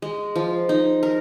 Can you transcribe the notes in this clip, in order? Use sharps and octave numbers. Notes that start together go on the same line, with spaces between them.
G#3
F3
D#4
A#4